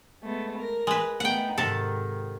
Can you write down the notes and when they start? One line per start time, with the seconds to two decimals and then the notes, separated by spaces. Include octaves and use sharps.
0.23 G#3 A3 B3
0.58 A#4 A#6
0.87 G#3 B4
1.20 A3 B3 D#4 F#5 G5
1.58 G#2 C3 D#3 A4